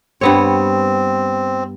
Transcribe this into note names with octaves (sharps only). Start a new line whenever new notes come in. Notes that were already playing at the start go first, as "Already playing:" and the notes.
G2 B3 C4 C#5